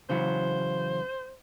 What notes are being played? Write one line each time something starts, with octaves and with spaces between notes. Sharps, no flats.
C#3 E3 F#3 C5